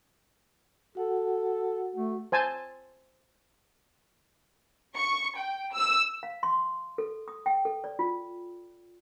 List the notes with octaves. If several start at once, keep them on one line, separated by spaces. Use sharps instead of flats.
F#4 A4 F#5
A3
C5 G#5 A5
C#6
G5
E6
F5
C6
A4
D#6
G5
A4
D5
F4